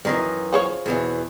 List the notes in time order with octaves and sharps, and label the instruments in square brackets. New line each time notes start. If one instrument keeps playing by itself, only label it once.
[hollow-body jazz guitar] F#2 D#3 E3
[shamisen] F3 G#4 C#5
[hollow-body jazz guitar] E2 B2 E3